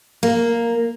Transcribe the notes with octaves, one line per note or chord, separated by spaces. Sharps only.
A#3